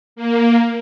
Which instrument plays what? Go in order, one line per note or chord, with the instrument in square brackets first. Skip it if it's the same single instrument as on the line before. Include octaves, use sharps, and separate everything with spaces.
[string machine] A#3